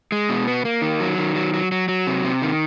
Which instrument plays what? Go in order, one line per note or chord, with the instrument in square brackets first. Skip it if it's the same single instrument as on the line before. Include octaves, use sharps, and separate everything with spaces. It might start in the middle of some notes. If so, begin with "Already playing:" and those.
[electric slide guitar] G#3
B2
B3
A#3
D#3
F#3
D#3
F#3
F#3
F#3
F#3
C3
C3
D#3